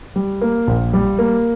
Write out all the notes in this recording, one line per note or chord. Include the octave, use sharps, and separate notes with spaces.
G3
A#3
A#1
G3
A#3